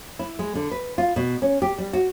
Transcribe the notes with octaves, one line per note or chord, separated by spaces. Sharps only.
E4
G#3
D3
B4
F4
B2
C#4
G4
G3
F#4